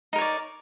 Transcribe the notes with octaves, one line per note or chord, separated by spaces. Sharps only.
D#4 A#4 C#5 D5